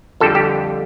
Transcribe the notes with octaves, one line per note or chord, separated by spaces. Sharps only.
F2 D3 G3 A4
G4